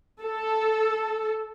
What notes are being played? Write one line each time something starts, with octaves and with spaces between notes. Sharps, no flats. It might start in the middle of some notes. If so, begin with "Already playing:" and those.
A4